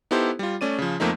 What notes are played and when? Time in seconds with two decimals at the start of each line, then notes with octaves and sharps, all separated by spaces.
0.11 B3 D#4 E4 G4 A4 C5
0.39 G3 F4
0.61 A3 C#4 D5 D#7
0.78 C#3 F3
1.00 F2 F3 A3 A#3 C4 D#4